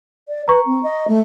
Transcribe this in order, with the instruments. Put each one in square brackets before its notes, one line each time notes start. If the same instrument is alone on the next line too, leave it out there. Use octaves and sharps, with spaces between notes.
[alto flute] D5
[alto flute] B4 [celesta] A#5 C#6
[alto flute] C4
D#5
A3